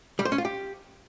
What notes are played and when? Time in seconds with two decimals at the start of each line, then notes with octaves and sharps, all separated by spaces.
0.19 G3
0.25 C5
0.32 C#4
0.38 F4
0.45 G4